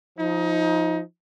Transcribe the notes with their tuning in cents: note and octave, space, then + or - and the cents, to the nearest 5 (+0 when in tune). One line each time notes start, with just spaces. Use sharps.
F3 +0 D#4 +25